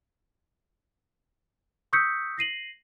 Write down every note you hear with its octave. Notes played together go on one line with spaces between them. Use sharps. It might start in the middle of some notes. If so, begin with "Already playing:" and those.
C#6 D#6 E6 G6 B6 C#7
A#6 C7 D#7 F#7